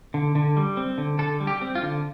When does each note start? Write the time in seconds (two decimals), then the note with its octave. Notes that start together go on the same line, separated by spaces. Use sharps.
0.14 D3
0.35 D3
0.57 G3
0.77 C4
0.98 D3
1.19 D3 A4
1.40 G3
1.47 G4
1.61 C4
1.75 F4
1.82 D3